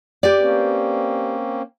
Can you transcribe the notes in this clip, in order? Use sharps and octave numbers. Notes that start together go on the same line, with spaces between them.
G4 B4 D5
A#3 C4 C#4